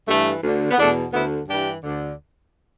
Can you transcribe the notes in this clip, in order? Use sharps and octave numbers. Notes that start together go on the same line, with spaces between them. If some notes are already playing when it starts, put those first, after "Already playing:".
G2 E3 A3
D2 D3
B3
E2 B2 A3 D4
D2 D3 B3 E4
G2 E3 D4 G4
D2 D3